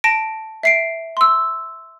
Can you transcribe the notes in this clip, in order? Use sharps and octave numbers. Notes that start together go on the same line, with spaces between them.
A5 A#6 D7
E5 C7 D7
C6 E6